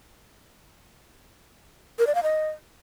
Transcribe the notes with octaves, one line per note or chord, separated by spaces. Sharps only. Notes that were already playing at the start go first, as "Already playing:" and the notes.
A#4
D5
F5
D#5